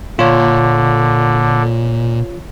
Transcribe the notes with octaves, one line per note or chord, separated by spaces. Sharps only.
A#2 D3 F4 C#5